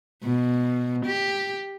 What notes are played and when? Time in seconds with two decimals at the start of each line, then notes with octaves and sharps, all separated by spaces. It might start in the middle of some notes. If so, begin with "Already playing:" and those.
0.23 B2
1.06 G4